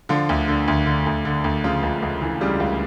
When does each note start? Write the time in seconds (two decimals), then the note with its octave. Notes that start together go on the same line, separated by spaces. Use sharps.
0.09 D3 F3 F4
0.29 D2
0.48 D3
0.68 D2
0.86 D3
1.07 D2
1.25 D3
1.44 D2
1.64 C#3 F3 F4
1.83 C#2
2.02 C#2
2.22 E3
2.41 C#3 G3 G4
2.60 C#2